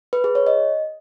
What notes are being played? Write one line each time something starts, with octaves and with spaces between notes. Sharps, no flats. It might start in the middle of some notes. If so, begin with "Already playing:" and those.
B4
G#4
C#5
D#5